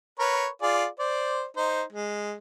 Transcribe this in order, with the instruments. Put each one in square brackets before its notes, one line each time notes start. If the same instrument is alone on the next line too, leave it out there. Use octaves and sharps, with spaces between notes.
[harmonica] A#4 B4 C#5
F4 G#4 D5
C5 D5
D#4 C5
G#3